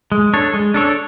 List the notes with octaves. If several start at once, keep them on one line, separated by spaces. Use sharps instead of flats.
G#3
D4 A4 C#5
G#3
D4 A4 C#5